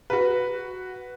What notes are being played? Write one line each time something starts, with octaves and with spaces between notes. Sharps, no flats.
F#4 B4